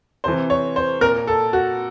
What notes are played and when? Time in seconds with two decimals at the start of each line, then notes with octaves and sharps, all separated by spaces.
0.24 C3 E3 C5
0.50 C#5
0.76 C5
1.01 A#2 A#4
1.27 A4
1.53 F#4